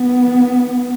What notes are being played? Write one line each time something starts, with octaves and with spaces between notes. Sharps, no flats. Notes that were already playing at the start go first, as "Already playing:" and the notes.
Already playing: B3